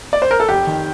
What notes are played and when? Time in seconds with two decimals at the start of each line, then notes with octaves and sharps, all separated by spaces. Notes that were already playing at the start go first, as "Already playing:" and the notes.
0.13 D5
0.22 C5
0.31 A#4
0.40 A4
0.48 F1 G4
0.67 D#3